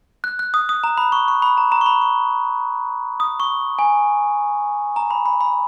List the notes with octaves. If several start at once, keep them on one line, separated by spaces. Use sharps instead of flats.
F#6
F#6
D#6
D#6
A#5
B5
C#6
C#6
B5
A#5
A#5
C#6
B5
C#6
D#6
C#6
G#5
A#5
B5
B5
B5